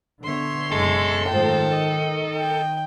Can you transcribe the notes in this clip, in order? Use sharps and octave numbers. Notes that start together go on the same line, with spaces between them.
D3 B3 C#5 E5 C6
F#1 B2 G#3 A4
G#2 D#3 F3 A3 G5
D#5
G5